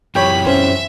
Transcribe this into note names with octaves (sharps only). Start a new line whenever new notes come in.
F#2 E3 G4 C#5 B5
C#4 C5 E5